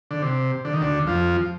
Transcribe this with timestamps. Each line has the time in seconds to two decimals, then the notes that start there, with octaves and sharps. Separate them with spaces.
0.11 D3
0.22 C3
0.65 D3
0.73 D#3
0.81 D2 D3
1.07 F2 F3